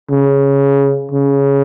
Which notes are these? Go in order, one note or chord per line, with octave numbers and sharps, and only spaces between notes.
C#3
C#3